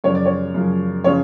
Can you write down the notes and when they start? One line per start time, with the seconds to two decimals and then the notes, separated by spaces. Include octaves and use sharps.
0.04 F#2 C#3 F3 C#5
0.15 D5
0.26 C#5
0.54 F#2 C#3 F3
1.04 C#3 F3 C#5